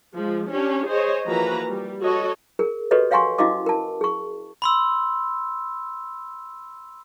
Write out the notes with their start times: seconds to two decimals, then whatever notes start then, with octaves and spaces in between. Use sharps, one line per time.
0.14 F3 G#3
0.50 C#4 D4 G4 C#5
0.87 G#4 C5 C#5 D#5
1.26 E3 F3 A#3 F#4 B4 A#5
1.69 G3
2.02 F#4 A4 C#5 D#5
2.59 G#4 A#4
2.91 F#4 G4 A4 B4 C#5 D#5
3.11 C#5 F5 F#5 G#5 C6 C#6
3.38 C#4 E4 F#4 D#5 F5 D6
3.66 A#4 A5
4.01 G#4 C#6
4.62 B5 C6 E6